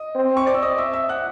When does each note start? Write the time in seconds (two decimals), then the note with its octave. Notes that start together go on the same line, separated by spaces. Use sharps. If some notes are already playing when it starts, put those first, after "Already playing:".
Already playing: D#5
0.15 C4
0.37 C#6
0.46 D5 D6
0.54 E6
0.63 D#5 D#6
0.78 E5 E6
0.93 E5 E6
1.09 F#5 F#6